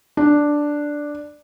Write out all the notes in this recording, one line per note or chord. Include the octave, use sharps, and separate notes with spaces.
D4